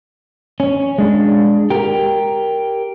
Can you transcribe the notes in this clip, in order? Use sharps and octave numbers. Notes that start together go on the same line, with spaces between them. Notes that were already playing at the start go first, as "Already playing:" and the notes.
C#4
G#3 D4
G4 A#4